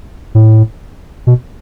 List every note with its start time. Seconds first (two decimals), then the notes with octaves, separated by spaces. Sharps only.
0.35 A2
1.27 B2